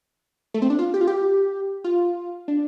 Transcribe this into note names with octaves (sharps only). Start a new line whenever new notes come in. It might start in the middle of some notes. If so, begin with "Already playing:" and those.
A3
C4
D4
F4
G4
F4
G4
F4
D4